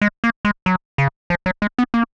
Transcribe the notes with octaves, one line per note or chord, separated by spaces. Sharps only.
G#3
A#3
G#3
F#3
C#3
F3
F#3
G#3
B3
A#3